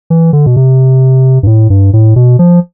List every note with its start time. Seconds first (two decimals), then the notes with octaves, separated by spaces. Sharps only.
0.10 E3
0.33 D3
0.46 B2
0.56 C3
1.43 G2
1.47 A2
1.70 G2
1.93 A2
2.16 B2
2.39 F3